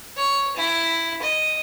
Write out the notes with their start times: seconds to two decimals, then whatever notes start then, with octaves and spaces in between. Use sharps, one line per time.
0.16 C#5
0.56 E4
1.22 D#5